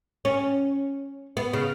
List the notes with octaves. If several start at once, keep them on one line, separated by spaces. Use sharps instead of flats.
C#4
B3
C#3